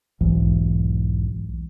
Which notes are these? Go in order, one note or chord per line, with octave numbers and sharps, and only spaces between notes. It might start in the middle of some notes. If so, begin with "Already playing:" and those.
B1 E2 G#2 E3